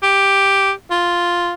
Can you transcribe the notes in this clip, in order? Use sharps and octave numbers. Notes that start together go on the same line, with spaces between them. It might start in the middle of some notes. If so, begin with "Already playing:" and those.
G4
F4